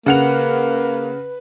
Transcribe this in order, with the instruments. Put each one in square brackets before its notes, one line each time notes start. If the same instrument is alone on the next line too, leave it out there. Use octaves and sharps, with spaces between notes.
[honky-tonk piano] C#3 F#5 F7 [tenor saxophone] A#3 [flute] B4